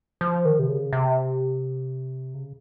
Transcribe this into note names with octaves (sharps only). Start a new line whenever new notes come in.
F3
D#3
C3
C#3
C3
C#3